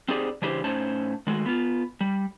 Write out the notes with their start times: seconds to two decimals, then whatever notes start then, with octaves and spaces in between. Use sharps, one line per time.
0.08 C4 D#4 G4 G#4 C5 D5
0.42 C#3 E3 D4 E4 G4 C5
0.64 A2 C#4 D#4 C5 A5
1.27 D#3 G#3 A3 F#4
1.46 B3 F4
2.01 G3